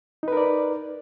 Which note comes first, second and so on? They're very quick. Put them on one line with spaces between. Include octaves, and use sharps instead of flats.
D#4 B4 A#4 D5